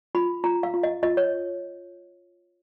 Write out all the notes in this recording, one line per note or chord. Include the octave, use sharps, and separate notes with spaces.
F4 B5
F4 A#5
F5
F4
D#5
F4 D#5
C#5